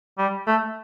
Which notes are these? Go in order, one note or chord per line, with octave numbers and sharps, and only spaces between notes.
G3
A3